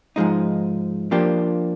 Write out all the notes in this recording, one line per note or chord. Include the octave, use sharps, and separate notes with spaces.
G#2 F3 G#3 D#4
F3 A#3 D4 G4